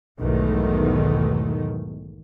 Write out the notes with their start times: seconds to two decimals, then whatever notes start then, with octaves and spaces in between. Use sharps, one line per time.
0.20 B1 E2 G#2 D#3 A3